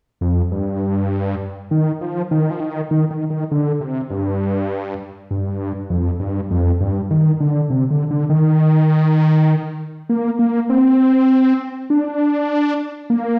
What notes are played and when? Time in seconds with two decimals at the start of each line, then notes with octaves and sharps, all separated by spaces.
0.21 F2
0.51 G2
1.71 D#3
2.01 F3
2.31 D#3
2.51 F3
2.60 D#3
2.91 D#3
3.11 D#3
3.30 D#3
3.51 D3
3.81 C3
4.10 G2
5.31 G2
5.90 F2
6.20 G2
6.51 F2
6.80 G2
7.11 D#3
7.40 D3
7.70 C3
7.90 D3
8.11 D3
8.29 D#3
10.09 A#3
10.39 A#3
10.70 C4
11.90 D4
13.10 A#3